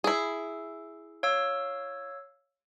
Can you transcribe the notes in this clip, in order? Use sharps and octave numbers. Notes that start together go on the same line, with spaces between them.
E4 G#4
C#5 F5 E6